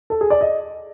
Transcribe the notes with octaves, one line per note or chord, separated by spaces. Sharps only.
A4
G#4
D5
D#5